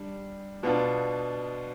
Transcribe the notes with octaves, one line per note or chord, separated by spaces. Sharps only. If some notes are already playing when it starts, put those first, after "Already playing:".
Already playing: G3 D4
B2 B3 D4 F4